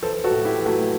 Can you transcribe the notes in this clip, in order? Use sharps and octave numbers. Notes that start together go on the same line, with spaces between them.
E3 A4 C5
F#4 A4
A2
E4 G4
E3
F#3 A3